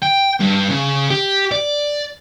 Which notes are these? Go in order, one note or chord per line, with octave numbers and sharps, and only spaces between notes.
G5
G2
C#3
G4
D5